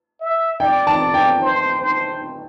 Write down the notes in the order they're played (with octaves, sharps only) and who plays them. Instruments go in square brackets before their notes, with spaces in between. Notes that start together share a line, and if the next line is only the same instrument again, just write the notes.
[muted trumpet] E5
[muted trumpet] D5 [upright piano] G5
[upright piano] A5
G5
[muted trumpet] C5
C5